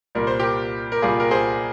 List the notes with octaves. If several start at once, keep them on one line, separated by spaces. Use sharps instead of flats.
C2 A#2 G3 A#4
C5
G4 A#4
A#4
C2 A#2 G3 F4 G#4
A#4
G#4 C5